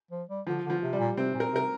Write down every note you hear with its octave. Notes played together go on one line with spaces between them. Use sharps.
F3
G3
D3 F3
D3
F3
C3
G3
A#2
C3 C4
A#2
A#4
C3 A#4